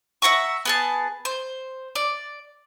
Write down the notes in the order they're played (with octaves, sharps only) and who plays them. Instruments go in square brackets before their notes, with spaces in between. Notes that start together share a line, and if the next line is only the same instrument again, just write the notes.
[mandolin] E5 F#5 A#5 C#6
B3 G#4 A5
C5
D5